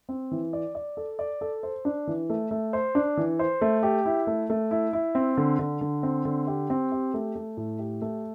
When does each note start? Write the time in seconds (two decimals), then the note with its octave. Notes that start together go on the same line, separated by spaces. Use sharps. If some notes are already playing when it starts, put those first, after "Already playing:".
0.09 C4
0.31 E3
0.53 D5
0.75 D5
0.97 A4
1.19 D5
1.41 A4
1.63 C5
1.85 D4
2.07 E3
2.30 A3
2.51 A3
2.73 C5
2.95 D4
3.17 E3
3.39 C5
3.61 A3
3.83 G4
4.06 E4
4.27 A3
4.50 A3
4.71 E4
4.93 E4
5.15 C4
5.37 D3
5.59 D3
5.81 D3
6.03 C4
6.25 D3
6.47 G4
6.70 C4
6.92 G4
7.14 A3
7.35 A3
7.57 A2
7.79 G4
8.02 A3